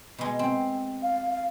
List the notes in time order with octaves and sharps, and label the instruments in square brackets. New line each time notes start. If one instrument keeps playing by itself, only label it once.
[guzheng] B2 G#3
C4
[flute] F5
F5